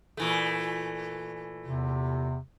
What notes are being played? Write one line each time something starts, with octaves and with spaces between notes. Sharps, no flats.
A#2 E3 A3
E2 C3